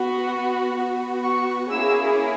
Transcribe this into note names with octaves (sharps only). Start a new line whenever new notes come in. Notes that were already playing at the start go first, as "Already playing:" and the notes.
Already playing: B3 F#4
B3 F#4
C#6
A#3 C#4 E4 G#4 E6